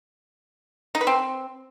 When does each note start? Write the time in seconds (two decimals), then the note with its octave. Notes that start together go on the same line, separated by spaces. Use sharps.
0.95 D#4
1.01 B4
1.07 C4